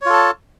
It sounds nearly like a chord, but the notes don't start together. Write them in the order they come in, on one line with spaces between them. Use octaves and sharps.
C#5 F4 A4 A5